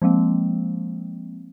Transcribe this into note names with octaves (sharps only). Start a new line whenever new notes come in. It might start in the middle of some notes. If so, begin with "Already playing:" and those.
F3 G#3 A#3 C4